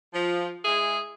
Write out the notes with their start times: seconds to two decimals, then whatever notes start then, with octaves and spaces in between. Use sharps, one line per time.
0.13 F3
0.64 G#3 E4 G#4